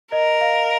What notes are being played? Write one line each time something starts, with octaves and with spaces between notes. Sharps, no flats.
A#4 D#5
F5